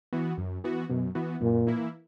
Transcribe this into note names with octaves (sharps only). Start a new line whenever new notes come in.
E3 B3 F#4
F#2
E3 B3 F#4
F#2 B2
E3 B3 F#4
F#2 A#2
E3 A#3 E4